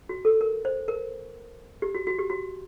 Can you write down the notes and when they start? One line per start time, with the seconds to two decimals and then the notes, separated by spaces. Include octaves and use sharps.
0.09 F#4
0.25 A4
0.41 A#4
0.65 C5
0.88 A#4
1.82 G4
1.95 F#4
2.07 F#4
2.19 G4
2.30 F#4